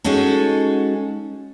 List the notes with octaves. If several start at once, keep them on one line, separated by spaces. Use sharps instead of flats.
G#3 C#4 D#4 F#4 A4